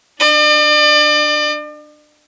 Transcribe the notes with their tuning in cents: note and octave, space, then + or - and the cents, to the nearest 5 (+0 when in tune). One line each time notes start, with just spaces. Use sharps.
D4 +15 D5 +40